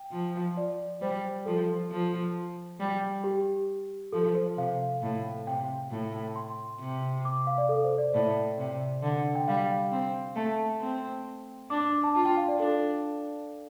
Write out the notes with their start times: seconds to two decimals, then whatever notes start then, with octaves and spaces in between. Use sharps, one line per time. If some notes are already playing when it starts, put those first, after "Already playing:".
Already playing: G5
0.12 F3
0.57 D5
1.01 G3 C5
1.46 F3 A4
1.91 F3
2.80 G3
3.24 G4
4.12 F3 A4
4.35 C5
4.57 C3 F5
5.02 A2
5.47 C3 G5
5.91 A2
6.36 C6
6.80 C3
7.25 D6
7.47 F5
7.58 D5
7.69 A4
7.84 C5
7.98 D5
8.13 A2 D5
8.58 C3
9.02 D3
9.35 G5
9.48 G3 F5
9.92 C4
10.36 A3 A5
10.81 C4
11.70 D4 D6
11.81 D6
11.92 D6
12.04 A5
12.14 F4 A5
12.25 G5
12.37 F5
12.48 D5
12.59 D4 A4